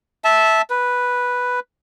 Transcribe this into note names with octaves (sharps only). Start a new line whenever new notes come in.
E5 A5
B4